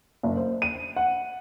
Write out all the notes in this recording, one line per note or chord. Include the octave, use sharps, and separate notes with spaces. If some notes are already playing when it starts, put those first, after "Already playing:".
F#1
C5
D#7
F#5